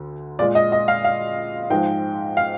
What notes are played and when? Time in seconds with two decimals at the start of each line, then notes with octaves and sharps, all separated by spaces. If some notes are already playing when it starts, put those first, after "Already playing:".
Already playing: D2 D3
0.39 A#2 G#3 D5
0.55 D#5
0.72 D#5
0.88 F5
1.05 F5
1.70 G#2 F3 G#3 G5
2.37 F5